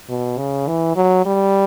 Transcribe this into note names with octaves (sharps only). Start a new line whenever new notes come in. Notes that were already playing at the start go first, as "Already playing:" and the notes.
B2
C#3
E3
F#3
G3